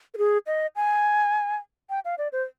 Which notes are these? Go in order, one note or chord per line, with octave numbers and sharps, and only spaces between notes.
A#4
G#4
D#5
G#5
G5
F5
D5
C5